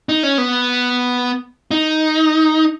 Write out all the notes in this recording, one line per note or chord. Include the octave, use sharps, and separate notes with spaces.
D#4
C#4
B3
D#4